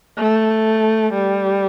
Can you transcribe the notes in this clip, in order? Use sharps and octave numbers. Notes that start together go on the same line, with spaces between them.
A3
G3